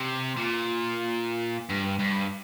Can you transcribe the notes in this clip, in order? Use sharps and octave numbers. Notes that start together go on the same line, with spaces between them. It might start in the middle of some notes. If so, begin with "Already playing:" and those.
Already playing: C3
A#2
G2
G2